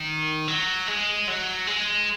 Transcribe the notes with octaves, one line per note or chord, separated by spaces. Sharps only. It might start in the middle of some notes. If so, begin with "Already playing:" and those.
Already playing: D#3
F#3
G#3
F#3
G#3